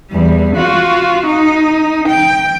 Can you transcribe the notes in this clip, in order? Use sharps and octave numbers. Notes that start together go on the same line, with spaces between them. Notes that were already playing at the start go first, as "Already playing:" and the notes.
E2 G3
F4 F#4
D#4
G5